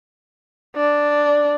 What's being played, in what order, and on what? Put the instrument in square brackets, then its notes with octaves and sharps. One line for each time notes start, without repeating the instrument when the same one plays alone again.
[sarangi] D4